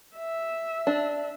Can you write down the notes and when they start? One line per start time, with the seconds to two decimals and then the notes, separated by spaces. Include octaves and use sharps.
0.16 E5
0.87 D4